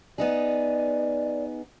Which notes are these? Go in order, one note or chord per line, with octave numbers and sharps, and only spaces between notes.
B3 D#4 G#4 D5